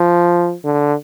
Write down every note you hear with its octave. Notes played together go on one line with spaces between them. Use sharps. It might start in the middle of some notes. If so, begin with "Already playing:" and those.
Already playing: F3
D3